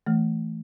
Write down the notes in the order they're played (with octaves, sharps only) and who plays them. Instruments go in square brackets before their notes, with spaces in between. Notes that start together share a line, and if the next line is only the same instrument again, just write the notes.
[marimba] E3 A3